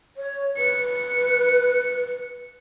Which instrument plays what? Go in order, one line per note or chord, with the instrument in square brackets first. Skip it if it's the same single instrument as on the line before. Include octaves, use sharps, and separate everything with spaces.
[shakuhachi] C#5
[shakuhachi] B4 [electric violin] C#7